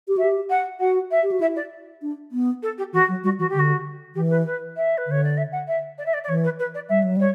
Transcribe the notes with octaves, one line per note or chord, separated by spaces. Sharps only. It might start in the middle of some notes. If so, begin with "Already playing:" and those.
G4
F#4 E5
G4
F#5
F#4 F#5
E5
G4
F#4
E4 E5
D5
D4
B3
A4
G4
E3 F#4
F#3
G3 F#4
E3 F#4
D3 G4
F#4
E3 G4
B4
B4
E5
B4
D3 C#5
D5
E5
F#5
E5
D5
E5
D5
D5
E3 C#5
B4
B4
D5
G3 E5
F#3
G3 C#5